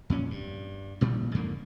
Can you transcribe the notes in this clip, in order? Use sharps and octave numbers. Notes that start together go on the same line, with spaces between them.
F2 A#2 C#4
G2
A1 A#2 G3
F2 G#2 D3 A#3